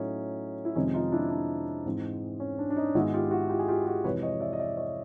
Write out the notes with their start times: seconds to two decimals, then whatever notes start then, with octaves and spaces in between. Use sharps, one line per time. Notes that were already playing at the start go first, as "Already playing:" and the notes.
Already playing: A2 F#3 A3 C#4 D#4
0.65 E4
0.75 F2 C3 D#3 G#3 C4 C#4 D#4
0.94 D#4 F4
1.12 D4 E4
1.31 D4
1.86 G#2 E3 G#3 C4
2.40 C#4
2.59 D4
2.70 D4
2.76 C#4 D#4
2.95 G#2 D#3 G#3 B3 E4 F#4
3.14 F4 G4
3.31 E4 F#4
3.50 F4 G4
3.59 G#4
3.68 F4 G4
3.86 F#4 G#4
4.04 F2 C3 E3 G#3 B4 C#5
4.23 C#5 D#5
4.40 D5 E5
4.53 D#5
4.59 D5 E5
4.77 C#5 D#5